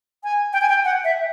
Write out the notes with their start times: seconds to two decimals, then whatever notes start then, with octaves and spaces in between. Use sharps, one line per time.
0.24 G#5
0.53 G5
0.61 G#5
0.69 G5
0.85 F#5
1.04 E5